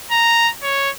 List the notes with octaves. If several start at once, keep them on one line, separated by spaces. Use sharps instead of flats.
A#5
C#5